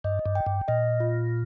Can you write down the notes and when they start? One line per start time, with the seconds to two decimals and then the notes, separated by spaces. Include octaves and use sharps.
0.04 G2 D#5
0.26 G2
0.35 G5
0.46 G2
0.68 A#2 D#5
1.00 F4